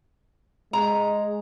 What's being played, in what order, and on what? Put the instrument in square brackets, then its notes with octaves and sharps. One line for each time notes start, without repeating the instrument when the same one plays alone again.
[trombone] G#3 [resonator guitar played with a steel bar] A#5